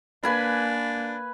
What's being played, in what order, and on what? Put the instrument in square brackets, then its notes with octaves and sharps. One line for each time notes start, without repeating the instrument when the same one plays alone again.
[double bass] A#3 [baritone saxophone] D4 [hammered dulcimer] B4 G#5 B5